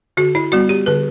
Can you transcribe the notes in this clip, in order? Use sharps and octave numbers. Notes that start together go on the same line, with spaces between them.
D3 F#4
E4
G3 B3 F#4
G4
D3 B4